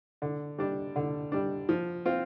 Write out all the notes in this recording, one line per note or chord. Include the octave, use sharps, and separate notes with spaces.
D3
G3 D4
D3
G3 D4
F3
C4 F4